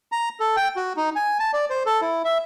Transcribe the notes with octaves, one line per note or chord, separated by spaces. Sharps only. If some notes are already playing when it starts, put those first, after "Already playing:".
A#5
A4
G5
F#4
D#4
G#5
A5
D5
C5
A4
E4
E5